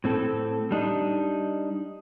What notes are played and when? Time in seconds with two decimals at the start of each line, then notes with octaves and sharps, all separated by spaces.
0.04 A2 C4 A4
0.71 G3 D4 D#4